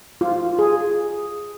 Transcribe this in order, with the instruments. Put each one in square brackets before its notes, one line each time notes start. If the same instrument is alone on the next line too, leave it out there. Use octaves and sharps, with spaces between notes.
[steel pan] F4
G#4